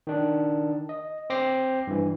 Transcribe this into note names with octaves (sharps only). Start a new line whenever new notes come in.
D#3 D4
D#5
C4 C5 D6 A#6 C7
G2 E3